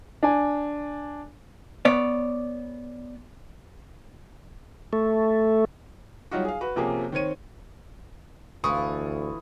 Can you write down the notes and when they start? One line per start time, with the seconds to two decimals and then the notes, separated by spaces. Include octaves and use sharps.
0.23 D4 G#5
1.85 B3 C#5 D5
4.93 A3
6.31 F#3 G3 D#4 F4 F#4
6.45 G#4 F5
6.61 F#4 B4
6.76 C3 F3 A#3 C#4 G4 G#4
7.12 D#3 C4 C#5 D#7
8.64 D2 E3 F4 A4 F5 C#6 D#6